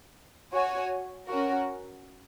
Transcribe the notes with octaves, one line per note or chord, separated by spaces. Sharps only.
F#4 C#5 G#5
C#4 F#4 A#4